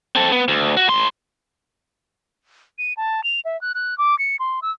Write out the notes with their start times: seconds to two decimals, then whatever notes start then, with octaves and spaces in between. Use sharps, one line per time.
0.15 C4 A4
0.32 B3
0.48 D2
0.77 F#4
0.88 A2 C6
2.78 D#7
2.97 A5
3.24 F7
3.45 E5
3.61 F#6
3.75 F#6
3.98 D6
4.19 C#7
4.40 C6
4.62 E6